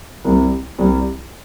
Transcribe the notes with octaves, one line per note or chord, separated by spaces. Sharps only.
C2 C3 G3
C2 C3 G3